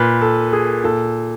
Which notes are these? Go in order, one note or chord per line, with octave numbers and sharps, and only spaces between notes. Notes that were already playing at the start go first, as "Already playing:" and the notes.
Already playing: A#2 B4
A4
G#4
A#2 A4